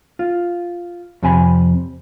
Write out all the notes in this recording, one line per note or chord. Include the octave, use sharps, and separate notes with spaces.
F4
F2 C3 G#5 B5